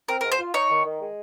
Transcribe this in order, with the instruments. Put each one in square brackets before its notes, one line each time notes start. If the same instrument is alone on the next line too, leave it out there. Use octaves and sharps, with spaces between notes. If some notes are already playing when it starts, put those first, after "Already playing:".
[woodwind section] C4 [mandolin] A#4
[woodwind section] G#2 [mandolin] A#4
[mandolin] C5
[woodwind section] F4
[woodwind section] D#4 [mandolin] C#5
[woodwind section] D#3
D#3
G#3